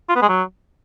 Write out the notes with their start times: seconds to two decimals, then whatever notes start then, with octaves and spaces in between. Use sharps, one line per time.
0.09 F4
0.16 B3
0.22 G#3
0.29 F#3